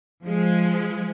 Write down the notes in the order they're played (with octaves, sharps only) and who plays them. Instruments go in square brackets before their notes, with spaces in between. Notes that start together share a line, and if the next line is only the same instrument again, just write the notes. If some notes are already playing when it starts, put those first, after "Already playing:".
[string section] F3 G#3